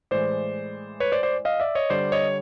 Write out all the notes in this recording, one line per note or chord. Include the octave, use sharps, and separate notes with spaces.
A2 E3 G#3 C5 D5
B4 C#5
C5 D5
C5 D5
D#5 F5
D5 E5
C#5 D#5
D3 G3 C5 D5
C#5 D#5